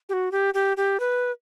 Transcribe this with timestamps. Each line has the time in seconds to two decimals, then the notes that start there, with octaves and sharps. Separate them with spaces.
0.09 G4
0.13 F#4
0.32 G4
0.54 G4
0.77 G4
1.00 B4